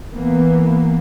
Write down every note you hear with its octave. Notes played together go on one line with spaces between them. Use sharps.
E3 A#3 B3